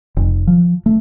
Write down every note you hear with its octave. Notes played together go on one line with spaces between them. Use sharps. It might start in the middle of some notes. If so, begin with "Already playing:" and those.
F1
F3
A3